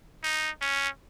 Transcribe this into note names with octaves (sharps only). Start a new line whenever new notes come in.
D#4
C#4